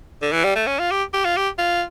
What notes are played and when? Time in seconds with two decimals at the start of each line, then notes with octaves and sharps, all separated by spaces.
0.22 D3
0.33 E3
0.44 G3
0.56 A3
0.67 C#4
0.79 F4
0.91 G4
1.14 G4
1.25 F4
1.37 G4
1.59 F4